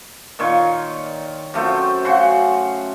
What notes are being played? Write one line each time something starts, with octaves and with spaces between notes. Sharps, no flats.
A#2 D#3 C#5 C6
F#2 A3 C4 G5
C#3 F#4 F#5 C6